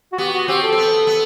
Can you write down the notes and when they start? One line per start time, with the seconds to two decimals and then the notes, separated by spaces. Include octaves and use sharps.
0.12 F#4
0.18 B3 G4
0.34 F#4
0.48 C4 G4
0.62 A4
0.72 C4
0.78 B3
1.07 B3